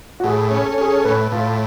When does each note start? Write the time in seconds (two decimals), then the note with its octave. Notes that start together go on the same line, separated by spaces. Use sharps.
0.20 F#4
0.24 A2 G#4
0.51 C#4
0.65 A4
0.78 C#4 G#4
0.94 A4
1.05 A2 B4
1.32 A2 F4